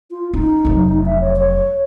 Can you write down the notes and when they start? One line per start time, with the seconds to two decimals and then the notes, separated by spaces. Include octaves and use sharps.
0.11 F4
0.34 C#4 D#4
0.65 F1 F#3
1.06 E5
1.21 C#5
1.36 C#5